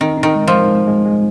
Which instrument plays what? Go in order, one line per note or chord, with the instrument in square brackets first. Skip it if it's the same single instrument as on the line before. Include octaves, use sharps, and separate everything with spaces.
[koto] D#3 [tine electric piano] C4
[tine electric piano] D#4
[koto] D#3
[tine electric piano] G#3
[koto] F3
[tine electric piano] G#3
G#3
G#3
G#3